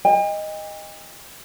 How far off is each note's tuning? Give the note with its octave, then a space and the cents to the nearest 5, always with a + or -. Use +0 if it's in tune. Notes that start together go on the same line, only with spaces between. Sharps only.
D#5 +0 G5 +45